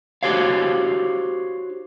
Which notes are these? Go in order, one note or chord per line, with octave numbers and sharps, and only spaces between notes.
D#4 F#4 G4 C5 C#5 F5